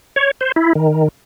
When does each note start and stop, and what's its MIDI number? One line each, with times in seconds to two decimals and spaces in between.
0.16 0.31 73
0.41 0.52 72
0.56 0.73 64
0.75 1.08 51